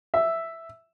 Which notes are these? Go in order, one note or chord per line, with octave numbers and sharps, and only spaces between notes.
E5